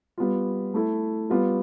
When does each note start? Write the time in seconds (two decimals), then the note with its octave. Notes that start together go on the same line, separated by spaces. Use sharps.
0.18 G3 B3 F4
0.74 A3 E4 A4
1.30 G3 B3 F4